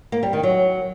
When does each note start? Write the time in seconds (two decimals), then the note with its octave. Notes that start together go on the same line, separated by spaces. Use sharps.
0.12 A#3
0.23 G3
0.33 D#3
0.43 F#3